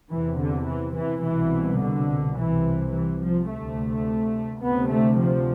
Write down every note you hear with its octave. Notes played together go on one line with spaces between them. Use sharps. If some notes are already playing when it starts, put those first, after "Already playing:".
E2 C3 E3
D3
E3
E3
C2 B2 E3
D3
C2 C3 E3
E3
F3
D2 C3 A3
D2 C3 B3
A3
F3